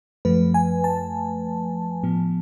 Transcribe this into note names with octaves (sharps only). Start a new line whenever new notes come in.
F#2 F3 A3 B4
G#5
A5
A2 F3 B3